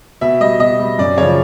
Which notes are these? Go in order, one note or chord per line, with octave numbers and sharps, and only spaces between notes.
B2 E5
G3 D#5
B2 D#5
G3
F#2 D5
C#3 F3 C#5